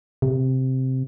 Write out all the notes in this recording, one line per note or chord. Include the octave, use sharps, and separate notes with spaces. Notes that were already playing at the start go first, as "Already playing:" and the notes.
C3